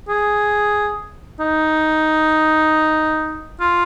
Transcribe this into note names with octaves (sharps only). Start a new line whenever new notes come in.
G#4
D#4
F4